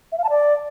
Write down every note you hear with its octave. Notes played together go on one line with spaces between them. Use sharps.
E5
F5
A5
D5